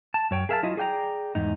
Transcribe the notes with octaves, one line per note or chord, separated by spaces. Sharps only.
A5
F#2 C#5 G5
G#4 A#4 E5 F5 G5 A5
F#3 E4 F4 D#5
G#4 D5 G5 G#5 A#5
E2 G#2 D#4